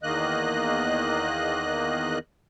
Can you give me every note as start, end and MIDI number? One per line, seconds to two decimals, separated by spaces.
0.03 2.18 40
0.03 2.18 51
0.03 2.18 58
0.03 2.18 75
0.03 2.18 90